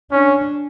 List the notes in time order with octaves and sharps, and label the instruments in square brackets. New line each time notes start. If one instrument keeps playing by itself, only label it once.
[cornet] C#4 [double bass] D4